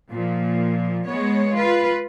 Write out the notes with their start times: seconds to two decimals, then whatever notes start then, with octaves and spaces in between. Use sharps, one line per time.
0.11 A#2 F3
1.07 G#3 B3 C#5
1.54 F4 B4